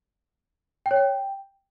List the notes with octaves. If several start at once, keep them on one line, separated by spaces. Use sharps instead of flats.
G5
C#5
G5